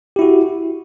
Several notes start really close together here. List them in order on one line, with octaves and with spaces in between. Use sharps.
G4 E4 F#4